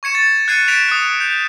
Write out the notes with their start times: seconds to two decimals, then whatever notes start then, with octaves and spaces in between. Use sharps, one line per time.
0.03 C#6 G#6 C#7 E7
0.15 A6
0.48 F#6 G#6 A6 C7 C#7 D#7
0.68 A6 B6 D7 E7 F7
0.89 D#6 F#6
1.20 G6